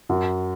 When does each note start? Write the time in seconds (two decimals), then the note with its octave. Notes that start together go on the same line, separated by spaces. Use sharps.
0.09 F#2